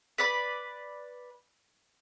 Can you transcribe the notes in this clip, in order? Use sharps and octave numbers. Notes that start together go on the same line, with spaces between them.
B4 D5 B5